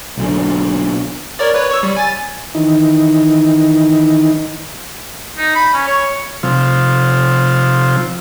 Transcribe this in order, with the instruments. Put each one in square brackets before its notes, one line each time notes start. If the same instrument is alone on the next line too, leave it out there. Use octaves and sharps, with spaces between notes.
[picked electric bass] B1 D3
[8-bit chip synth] A#4 C#5 D5
B4 C#5
C#5 C#6 E6
G3
G#5 A6
[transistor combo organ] D#3 E3 D#4
[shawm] D#4
B5
C#4
C#5
[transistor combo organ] C3 F3